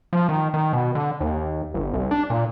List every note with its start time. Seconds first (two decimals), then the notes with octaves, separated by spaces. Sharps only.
0.13 F3
0.29 D#3
0.54 D#3
0.73 B2
0.95 D3
1.20 D#2
1.74 G1
1.94 C2
2.11 D4
2.30 A#2